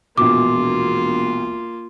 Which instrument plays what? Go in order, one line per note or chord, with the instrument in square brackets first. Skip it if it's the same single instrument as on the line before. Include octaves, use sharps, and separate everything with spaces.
[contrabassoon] E1 [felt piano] A#1 B2 [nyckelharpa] A#3 F4 [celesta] D6